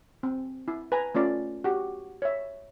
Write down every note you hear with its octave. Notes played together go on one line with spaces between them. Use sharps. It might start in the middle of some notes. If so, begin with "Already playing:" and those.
C4
E4
B4 G#5 A#5
A3 C#4 F4 D5
F#4 G4
C#5 E5